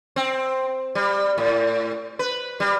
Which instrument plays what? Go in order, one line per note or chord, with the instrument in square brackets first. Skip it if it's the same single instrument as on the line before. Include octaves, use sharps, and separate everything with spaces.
[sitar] C4
G3
A2
B4
G3